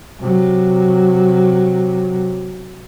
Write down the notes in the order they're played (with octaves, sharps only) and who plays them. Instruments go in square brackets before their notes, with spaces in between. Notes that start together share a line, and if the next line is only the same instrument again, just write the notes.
[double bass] C3 F#3